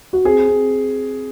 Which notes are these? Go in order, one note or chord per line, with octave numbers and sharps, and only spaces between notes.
F#4
C4 G#4
C4